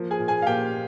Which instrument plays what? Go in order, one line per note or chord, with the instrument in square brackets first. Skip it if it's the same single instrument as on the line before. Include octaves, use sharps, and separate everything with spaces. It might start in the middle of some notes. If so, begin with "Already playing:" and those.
Already playing: [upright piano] F3 A#3
G#4 G#5
A#2
G#4 G#5
F5
A#2 G4 G5